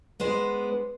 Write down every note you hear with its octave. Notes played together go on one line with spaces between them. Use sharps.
G#3 B3 D4 C5